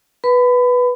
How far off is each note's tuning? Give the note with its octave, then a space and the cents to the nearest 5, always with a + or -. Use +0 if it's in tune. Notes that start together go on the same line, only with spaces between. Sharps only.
B4 -5 B5 +30